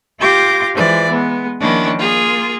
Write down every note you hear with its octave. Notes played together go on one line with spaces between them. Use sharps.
F4 G4 F5 D6 G6 A#6
E3 F3 G#3 D5
G#3 B3
D#3 F3 A#3 C#4 D4 E4
A#3 F4 G#4